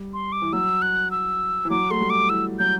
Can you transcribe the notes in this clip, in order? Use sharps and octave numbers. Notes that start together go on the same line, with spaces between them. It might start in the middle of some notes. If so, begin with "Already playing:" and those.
Already playing: G3
C6
D6
E3
F#3 E6
F#6
E6
E3
F#3 D6
A3 C6
G3
D6
E3 E6
F#3 G6